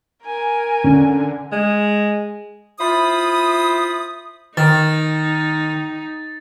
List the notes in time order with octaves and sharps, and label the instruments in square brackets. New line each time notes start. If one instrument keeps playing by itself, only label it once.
[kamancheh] A#4 G#5
[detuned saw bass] D3 [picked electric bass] C#4
[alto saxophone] G#3
[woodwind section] E4 F4 C5 B5 D#6
[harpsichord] D#3 [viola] D#4 [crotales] A6